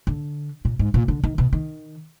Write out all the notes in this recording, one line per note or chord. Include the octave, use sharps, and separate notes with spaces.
D3
A#2
G#2
A#2
D3
D#3
B2
D#3